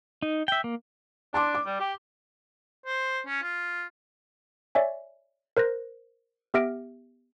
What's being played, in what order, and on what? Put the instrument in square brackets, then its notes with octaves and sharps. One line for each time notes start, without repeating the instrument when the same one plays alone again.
[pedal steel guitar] D#4
E5 G5
A#3
[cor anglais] D4 [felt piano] A5 C6 D6
[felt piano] D6
[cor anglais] G3
G4
[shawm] C5
C#4
F4
[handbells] C#5 D5 E5 G#5
A#4 C5 F#6 A#6
B3 G4 E5 F6 A#6 D7